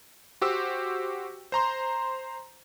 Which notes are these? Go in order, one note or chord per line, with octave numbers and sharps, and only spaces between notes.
F#4 G4 C5 E6
C5 A#5 C6